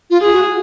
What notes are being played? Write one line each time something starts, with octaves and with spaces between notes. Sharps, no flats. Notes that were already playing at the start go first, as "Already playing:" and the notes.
F4
G#4
F#4